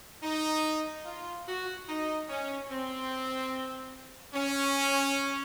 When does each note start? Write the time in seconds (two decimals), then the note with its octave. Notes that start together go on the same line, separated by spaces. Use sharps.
0.23 D#4
1.06 F4
1.47 F#4
1.88 D#4
2.29 C#4
2.70 C4
4.34 C#4